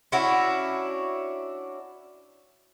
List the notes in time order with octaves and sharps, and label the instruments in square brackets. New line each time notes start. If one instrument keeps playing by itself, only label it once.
[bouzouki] C#4 D4 E4 F#4